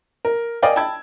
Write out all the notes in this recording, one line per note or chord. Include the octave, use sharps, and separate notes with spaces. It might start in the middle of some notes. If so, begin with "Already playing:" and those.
A#4
A#4 D5 D#5 F5 G5 G#5
G5 A5 B5 E6 G#6